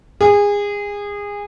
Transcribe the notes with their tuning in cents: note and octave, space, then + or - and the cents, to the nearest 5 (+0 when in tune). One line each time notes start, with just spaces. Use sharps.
G#4 -25